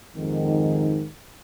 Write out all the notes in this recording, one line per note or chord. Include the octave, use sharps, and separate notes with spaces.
F2 G#2 D#3